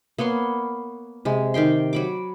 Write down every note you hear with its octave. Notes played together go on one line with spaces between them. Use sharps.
A#3 B3 C#5 C6
C3 G#3
D#3 G4 G5 C6
F#3 B5 D6